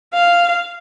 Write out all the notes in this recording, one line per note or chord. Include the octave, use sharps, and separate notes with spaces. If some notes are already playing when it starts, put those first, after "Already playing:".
F5